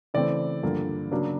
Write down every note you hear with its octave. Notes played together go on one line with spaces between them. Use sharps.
C#3 E3 A3 C4 D5
G2 D3 F3 A#3
C#3 F#3 A#3 D4